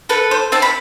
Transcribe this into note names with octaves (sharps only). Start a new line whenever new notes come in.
A4 B4
C5
C4 A5
B5